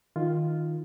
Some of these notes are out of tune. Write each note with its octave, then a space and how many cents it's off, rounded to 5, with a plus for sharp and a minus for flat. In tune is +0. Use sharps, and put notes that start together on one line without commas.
D#3 +0 F4 +0